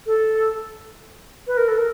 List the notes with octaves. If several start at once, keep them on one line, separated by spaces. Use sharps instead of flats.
A4
B4
A#4
A4
A#4